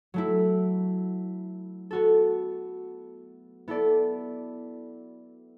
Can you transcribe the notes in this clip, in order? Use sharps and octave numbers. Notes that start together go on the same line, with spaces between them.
F#3 A3 E4
B3 F#4 A4
B3 E4 A4 D5